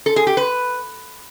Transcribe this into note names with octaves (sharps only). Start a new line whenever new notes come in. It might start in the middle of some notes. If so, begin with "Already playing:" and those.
A4
G#4
G4
B4